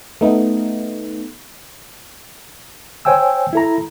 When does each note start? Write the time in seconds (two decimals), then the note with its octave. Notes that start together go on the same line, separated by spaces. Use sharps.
0.21 A3 B3 D#4
3.05 C5 C#5 G5 G#5 E6
3.53 E4 A4 A#5